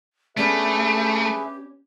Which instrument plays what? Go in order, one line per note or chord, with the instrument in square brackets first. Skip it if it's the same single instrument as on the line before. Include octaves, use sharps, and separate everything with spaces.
[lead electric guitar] A3 [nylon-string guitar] B3 C#4 D4 [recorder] G4 [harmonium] G#4 B4 E5